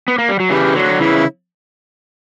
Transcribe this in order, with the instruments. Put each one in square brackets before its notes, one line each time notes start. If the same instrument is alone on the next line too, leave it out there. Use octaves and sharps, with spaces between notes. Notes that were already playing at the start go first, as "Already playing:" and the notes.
[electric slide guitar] B3
A#3
G3
F#3
[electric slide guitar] C#3 E3 [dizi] G4
[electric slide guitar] D3 F#3 [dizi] F#4
[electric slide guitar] C#3 E3 [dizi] E4